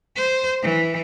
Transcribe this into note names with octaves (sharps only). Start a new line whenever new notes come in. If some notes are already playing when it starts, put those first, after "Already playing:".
C5
E3